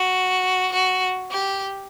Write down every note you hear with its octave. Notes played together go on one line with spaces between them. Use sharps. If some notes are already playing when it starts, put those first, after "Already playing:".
Already playing: F#4
F#4
G4